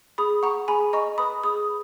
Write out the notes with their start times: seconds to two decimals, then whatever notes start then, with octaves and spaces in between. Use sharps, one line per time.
0.18 G#4 B5 D#6
0.43 F#5 A#5 C#6
0.68 G#4 G#5 B5
0.93 D#5 A#5 C#6
1.18 B4 B5 D#6
1.43 G#4 B5 D#6